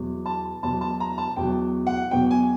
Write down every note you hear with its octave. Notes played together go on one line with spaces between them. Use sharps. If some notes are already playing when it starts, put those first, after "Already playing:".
Already playing: E2 B2 F#3
A5
E2 B2 F#3 A5
A5
A#5
A5
E2 B2 F#3 G5
F#5
E2 B2 F#3 G5
G#5